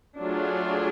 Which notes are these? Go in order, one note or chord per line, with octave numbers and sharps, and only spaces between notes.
F#3 A3 D4 F4 G#4